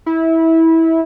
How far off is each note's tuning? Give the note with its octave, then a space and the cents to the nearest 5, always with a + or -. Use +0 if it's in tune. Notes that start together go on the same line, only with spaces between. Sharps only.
E4 -20